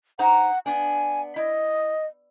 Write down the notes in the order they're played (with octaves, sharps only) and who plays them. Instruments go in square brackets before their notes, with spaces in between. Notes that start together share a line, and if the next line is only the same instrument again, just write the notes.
[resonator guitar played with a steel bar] D#4 C5 A#5 [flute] F#5
[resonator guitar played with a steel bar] B3 D4 [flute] G#5
[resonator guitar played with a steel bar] E4 [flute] D#5